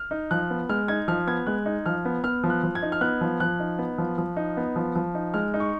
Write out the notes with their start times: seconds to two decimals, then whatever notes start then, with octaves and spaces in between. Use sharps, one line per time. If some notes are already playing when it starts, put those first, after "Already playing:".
Already playing: F6
0.11 D#4
0.31 F3 F#6
0.50 B3
0.69 G#3 F6
0.88 D#4 G#6
1.08 F3 F6
1.27 B3 G#6
1.47 G#3 F#6
1.66 D#4
1.86 F3 F6
2.05 B3
2.24 B3 F6
2.44 F3
2.50 F#6
2.63 F3
2.75 G#6
2.82 D#4
2.92 F6
3.01 B3 F#6
3.21 F3
3.40 F3 F#6
3.60 D#4
3.79 B3
3.98 F3
4.18 F3
4.37 D#4
4.57 B3
4.76 F3
4.95 F3
5.15 D#4
5.34 G#3 F6
5.54 D#4
5.60 C#6